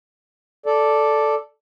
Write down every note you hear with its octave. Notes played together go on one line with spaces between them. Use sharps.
A4 D5